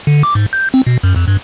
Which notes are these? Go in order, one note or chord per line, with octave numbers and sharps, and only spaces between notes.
D3
D6
G#2
G6
C4
B2
F#2
F2
G2